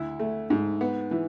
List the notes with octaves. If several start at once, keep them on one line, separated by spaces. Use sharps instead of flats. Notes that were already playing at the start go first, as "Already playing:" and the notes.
Already playing: D2 E4
A3
G#2
B3
E3